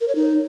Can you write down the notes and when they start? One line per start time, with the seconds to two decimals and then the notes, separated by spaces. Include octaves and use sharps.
0.01 A#4
0.08 C#5
0.15 D#4